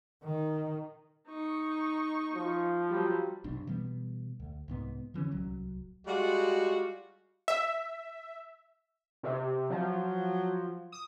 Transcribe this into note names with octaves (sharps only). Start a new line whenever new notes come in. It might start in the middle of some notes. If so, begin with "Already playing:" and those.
D#3
D#4 C#6
F3
F#3 G3
F#1 B1 C3 D4
B2 E3 G3 B3
D2
C2 G#2 B3
D3 E3 G#3 C#4
D1 C2 F#3
G3 G#3 F4 F#4
E5
C3
F3 F#3
D#6